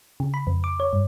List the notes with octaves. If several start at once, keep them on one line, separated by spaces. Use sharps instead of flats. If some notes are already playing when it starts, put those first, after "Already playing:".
C#3
B5
F2
D6
C#5
G2